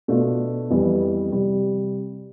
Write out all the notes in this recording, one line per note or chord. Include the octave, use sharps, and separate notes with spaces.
B2 A3 D4 F4
F2 E3 G3 B3
C3 G3